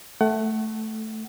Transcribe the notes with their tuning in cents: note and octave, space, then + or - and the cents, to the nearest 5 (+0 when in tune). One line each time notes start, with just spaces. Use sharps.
A3 +0 F#5 +30